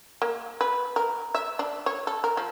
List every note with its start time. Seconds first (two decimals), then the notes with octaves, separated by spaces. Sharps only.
0.22 A#3
0.61 B4
0.96 A#4
1.35 E5
1.59 D4
1.86 C#5
2.07 A4
2.24 A#4
2.37 F3